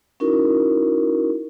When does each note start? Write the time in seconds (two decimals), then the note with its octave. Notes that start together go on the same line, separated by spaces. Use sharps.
0.20 C#4 D#4 E4 F#4 A#4